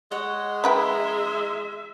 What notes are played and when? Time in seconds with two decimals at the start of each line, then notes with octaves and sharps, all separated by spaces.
0.11 G#3 C#5 D#5 F#5
0.64 C#4 E4 B4 E5 G5 A#5 B5